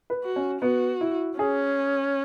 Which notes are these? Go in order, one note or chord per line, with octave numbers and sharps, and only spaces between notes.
B4
F#4
C#4
B3 F#4
E4
C#4 G#4